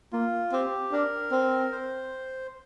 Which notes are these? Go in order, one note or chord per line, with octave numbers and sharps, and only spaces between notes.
A#3 F4
C4 G4
D4 A#4
C4
C5